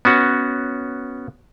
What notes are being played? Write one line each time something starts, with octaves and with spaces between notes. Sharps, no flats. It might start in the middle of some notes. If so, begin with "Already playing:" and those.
B3 C#4 F#4